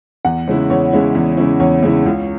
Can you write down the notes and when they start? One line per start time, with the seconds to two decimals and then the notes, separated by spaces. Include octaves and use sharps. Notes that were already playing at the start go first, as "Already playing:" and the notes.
0.25 E2 F#5
0.48 C#3 G#3 C#4 E4
0.70 E2 C#5
0.93 C#3 G#3 C#4 E4
1.15 E2
1.37 C#3 G#3 C#4 E4
1.60 E2 C#5
1.83 C#3 G#3 C#4 E4
2.06 C#2